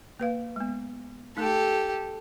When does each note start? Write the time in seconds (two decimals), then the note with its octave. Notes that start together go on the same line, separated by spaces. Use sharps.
0.20 A#3 B4 F5
0.56 G#3 B3
1.37 A3 D#4 G4 A4